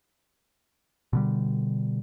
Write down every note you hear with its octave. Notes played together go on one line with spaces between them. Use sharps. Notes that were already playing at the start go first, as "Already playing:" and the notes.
B2 D3 G3